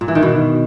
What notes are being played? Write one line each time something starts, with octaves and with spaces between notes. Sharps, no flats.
A#2
E3
D#3
B2